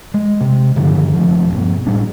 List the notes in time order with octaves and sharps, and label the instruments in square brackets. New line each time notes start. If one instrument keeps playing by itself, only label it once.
[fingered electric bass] G#3
C3
G2 D3 D#3 F3
E1 F3
G1 B2
A2 G3 D4